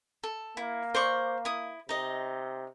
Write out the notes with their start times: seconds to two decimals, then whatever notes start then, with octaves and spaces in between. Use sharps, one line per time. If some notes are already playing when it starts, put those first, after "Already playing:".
0.23 A4
0.57 A#3 E4
0.94 C5 D5 C#6
1.45 E4 D#6
1.89 C3 D#4 D#5